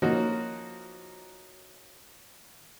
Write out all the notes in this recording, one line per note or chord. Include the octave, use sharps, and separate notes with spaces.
F3 A#3 C#4 D#4 F#4